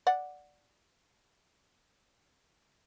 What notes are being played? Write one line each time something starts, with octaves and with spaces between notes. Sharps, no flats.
D5 F#5